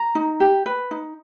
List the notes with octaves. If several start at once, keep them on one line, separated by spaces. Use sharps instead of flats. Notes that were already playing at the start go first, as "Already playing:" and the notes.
Already playing: A#5
D#4
G4
B4
D#4